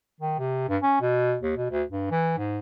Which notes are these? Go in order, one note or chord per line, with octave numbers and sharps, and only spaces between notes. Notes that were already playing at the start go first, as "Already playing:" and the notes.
D#3
C3
G2
C#4
B2
D#2
B2
D2
G2
E3
G#2